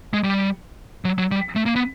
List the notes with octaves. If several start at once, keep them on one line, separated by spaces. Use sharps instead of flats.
G#3
G3
F#3
F#3
G3
A3
A#3
B3